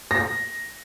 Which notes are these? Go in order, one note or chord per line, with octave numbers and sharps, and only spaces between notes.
A#6